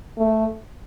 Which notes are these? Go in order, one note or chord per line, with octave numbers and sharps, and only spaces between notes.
A3